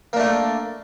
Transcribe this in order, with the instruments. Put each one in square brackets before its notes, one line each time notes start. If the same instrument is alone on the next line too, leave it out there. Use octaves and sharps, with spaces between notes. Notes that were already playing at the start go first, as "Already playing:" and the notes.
[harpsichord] A#3
D4
A3